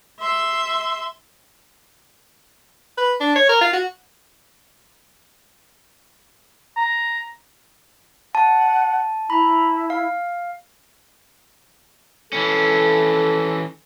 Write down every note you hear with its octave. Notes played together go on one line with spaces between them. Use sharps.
E5 C6
B4
D4
C#5
A#4
F4
F#4
A#5
F#5 A5
E4 A#5 B5
F5
E3 C#4 A4